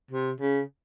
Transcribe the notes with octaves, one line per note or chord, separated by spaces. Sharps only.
C3
C#3